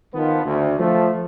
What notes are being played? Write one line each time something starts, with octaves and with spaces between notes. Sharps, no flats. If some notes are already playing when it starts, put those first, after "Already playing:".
D#3 F3 B3
D2
F3 A3